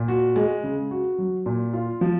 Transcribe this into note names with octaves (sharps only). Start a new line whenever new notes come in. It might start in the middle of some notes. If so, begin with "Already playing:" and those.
Already playing: A#2
F#4
G#3
C#3
F#4
F#3
A#2
F4
F3